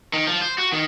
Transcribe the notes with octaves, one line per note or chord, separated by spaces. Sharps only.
D#3
F3
C5
F#4
D#3